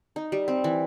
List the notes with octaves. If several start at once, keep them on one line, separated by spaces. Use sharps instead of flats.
D#4
G3
C4
E3